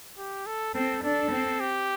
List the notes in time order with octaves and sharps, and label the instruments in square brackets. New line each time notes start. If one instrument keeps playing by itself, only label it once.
[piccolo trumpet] G4
A4
[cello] C4 [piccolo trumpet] A4
[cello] D4 [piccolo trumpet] A4
[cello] C4
[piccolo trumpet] G4